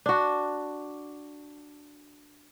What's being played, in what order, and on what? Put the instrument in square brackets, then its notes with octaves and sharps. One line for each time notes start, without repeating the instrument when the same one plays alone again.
[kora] D4 F#4